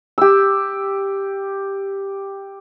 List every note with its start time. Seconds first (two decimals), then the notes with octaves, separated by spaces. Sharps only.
0.18 G4 E6